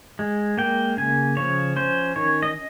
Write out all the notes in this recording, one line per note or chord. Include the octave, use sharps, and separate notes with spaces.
G#3
A#3 G5
C#3 G#5
F3 C#5
C#4 C5
D#3 C#5
D#5